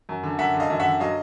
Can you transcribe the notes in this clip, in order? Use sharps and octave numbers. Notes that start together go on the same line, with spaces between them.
F#2
D3
F#2 E5 F#5
D3
D#5 F5
F#2
E5 F#5
D3
F#3 D#5 F5